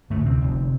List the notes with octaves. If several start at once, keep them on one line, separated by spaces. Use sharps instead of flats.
D2 A2 D3 A3
C3 C4
F1 F2 D3